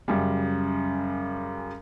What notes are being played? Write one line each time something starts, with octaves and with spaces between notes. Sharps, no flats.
F#2 C#3 G3